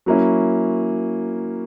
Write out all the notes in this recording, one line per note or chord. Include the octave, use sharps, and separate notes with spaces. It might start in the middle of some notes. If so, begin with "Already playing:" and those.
F#3 A#3 C#4 E4